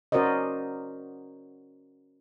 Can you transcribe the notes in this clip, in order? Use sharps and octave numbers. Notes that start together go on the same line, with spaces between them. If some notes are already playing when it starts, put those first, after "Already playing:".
C#4 F#4 A#4 C5 D5 D#5